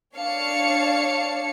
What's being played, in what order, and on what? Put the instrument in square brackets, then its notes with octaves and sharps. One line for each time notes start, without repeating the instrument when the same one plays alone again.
[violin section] D4 C#5 F5 A5 C#7